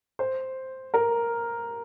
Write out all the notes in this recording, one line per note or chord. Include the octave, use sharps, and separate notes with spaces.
C5
A#4